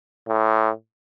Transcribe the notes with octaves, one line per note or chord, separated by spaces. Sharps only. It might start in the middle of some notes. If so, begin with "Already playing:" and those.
A2